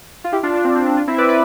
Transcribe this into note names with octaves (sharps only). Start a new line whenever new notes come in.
F4
E4 G4
D4 F4
D4
C4
C4
D4
D4 F4
C4 E4
E5
B4 D5
B4 D5